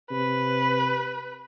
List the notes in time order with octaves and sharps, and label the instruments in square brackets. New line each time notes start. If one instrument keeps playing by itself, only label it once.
[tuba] C3 [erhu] B4